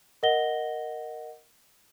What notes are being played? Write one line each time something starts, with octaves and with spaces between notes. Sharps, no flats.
A#4 D#5 F#5 A#6 G7